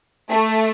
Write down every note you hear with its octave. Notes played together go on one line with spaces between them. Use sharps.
A3